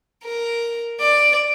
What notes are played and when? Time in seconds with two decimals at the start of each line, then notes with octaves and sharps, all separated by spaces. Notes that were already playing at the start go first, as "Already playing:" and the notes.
0.25 A#4
1.01 D5